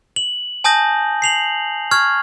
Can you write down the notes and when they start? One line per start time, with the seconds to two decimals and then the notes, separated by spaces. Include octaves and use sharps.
0.16 F#7
0.64 G#5 A5 D#6 G6 A#6
1.22 C7 F7 F#7
1.91 C#6 F6 G#6